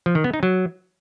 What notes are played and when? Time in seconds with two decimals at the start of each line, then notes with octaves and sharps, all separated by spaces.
0.06 F3
0.15 D#3
0.24 B3
0.34 D#4
0.43 F#3